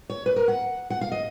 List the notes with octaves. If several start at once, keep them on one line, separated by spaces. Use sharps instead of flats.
C#5
B4
A#4
F#5
F#5
F5
D#5